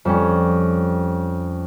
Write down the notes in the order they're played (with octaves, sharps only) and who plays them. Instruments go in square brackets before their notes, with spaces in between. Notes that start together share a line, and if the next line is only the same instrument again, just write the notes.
[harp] F2 G3 C#4